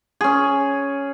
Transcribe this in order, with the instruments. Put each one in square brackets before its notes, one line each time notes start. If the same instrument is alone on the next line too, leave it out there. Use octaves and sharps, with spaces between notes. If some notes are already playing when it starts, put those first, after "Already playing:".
[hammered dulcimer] C#4 G#4